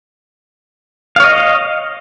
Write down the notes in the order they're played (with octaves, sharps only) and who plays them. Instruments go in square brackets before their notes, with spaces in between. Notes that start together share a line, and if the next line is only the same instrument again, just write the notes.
[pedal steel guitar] F5
C#5
D#5